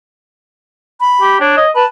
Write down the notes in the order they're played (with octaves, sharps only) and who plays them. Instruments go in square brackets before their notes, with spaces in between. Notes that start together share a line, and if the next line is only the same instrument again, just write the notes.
[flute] B5
[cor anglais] G4
[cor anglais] D4 [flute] C#5
[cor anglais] D#5
[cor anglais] B4 [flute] A5